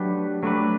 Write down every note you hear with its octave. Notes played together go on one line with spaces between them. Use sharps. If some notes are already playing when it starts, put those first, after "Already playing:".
Already playing: F#3 A3 D4 G4 B4
F#3 A3 D4 G4 B4